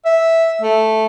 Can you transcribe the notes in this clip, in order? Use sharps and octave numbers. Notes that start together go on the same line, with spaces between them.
E5
A3